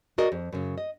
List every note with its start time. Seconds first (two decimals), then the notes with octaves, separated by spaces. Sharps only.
0.18 F#4 G#4 A#4 D5 D#5
0.32 F2
0.53 F#2 C#3
0.78 D#5